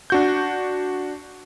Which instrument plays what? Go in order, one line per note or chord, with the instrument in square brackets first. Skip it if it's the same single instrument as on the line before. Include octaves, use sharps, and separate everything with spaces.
[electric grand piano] D4 F#4 G6